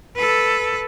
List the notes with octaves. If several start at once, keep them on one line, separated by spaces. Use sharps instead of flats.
A4 B4